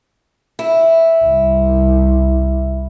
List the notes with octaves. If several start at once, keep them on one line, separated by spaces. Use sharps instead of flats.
E4
C2